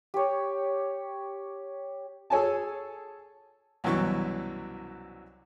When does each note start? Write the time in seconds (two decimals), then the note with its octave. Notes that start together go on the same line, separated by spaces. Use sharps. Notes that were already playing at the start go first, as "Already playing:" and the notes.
0.14 G4 C#5
2.30 G#4 A4 C#5 G#5 A5
3.84 C2 F#2 B2 E3 C#6